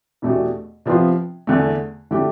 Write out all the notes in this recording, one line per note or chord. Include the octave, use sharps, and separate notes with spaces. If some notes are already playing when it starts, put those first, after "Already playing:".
E2 B2 A3 D4 G4
C3 F3 B3 F4
E2 D3 A3
D3 A3 E4 G4